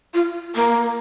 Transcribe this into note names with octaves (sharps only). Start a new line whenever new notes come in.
F4
A#3